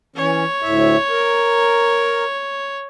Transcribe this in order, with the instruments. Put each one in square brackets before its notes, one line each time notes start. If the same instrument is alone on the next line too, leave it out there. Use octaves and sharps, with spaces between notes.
[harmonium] E3 C#4 [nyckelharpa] C#5
[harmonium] D2 A2 E5
A#4